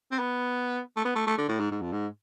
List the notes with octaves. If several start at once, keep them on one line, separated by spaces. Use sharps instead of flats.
C4
B3
A3
B3
A3
A3
D3
A2
G#2
G#2
F2
G#2